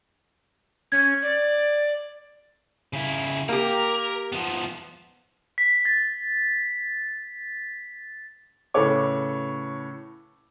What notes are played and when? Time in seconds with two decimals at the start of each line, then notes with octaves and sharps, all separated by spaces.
0.92 C#4 G#6
1.22 D5
2.93 C#3 E4
3.49 A#3 G4 A#4
4.32 F3 B3
5.58 B6
5.85 A6
8.74 A2 C#3 A4 B4 C#5 D6